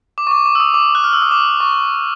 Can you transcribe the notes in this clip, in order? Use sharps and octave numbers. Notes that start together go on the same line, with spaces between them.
D6
C#6
D6
D6
E6
D#6
D6
F#6
F6
E6
D#6
D6
C#6